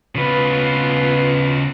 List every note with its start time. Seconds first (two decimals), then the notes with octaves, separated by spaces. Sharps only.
0.15 C#3 B3 F4 B4